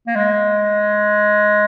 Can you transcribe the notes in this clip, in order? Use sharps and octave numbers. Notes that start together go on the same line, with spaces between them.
A#3
G#3